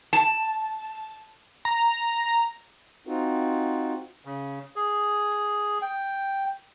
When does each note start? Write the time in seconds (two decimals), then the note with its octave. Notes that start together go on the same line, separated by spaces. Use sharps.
0.13 A5
1.65 A#5
3.07 C4 D#4 F4 F#4
4.25 C#3
4.76 G#4
5.82 G5